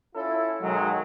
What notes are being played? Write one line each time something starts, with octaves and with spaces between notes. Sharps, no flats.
C#4 E4 F4 A4
B1 D#3 F#3 G#3